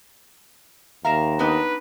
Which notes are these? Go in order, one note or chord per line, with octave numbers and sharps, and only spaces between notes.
D#2 A#4 E5 F5 A#5 A#6 E7
B3 D4 D#4 B4